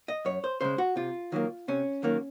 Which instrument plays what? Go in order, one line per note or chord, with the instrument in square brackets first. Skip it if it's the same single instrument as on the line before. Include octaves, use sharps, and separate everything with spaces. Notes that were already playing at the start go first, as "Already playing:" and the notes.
[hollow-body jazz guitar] D#5
F#2 C#5
C5
C#3 G#3 C5
F#4
C3 F4
D#3 F#3 A#3
C3 C#4
D#3 F#3 A#3